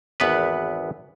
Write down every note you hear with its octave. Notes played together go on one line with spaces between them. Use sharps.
G#1 E2 B3 B4